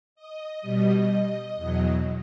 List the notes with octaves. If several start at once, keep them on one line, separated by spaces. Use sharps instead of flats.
D#5
B2 G3
E2 B2 F#3